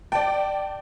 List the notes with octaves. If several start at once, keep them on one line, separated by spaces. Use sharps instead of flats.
D5 G5 A5